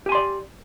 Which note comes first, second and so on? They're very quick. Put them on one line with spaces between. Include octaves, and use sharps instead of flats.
G4 G#5 C6 D5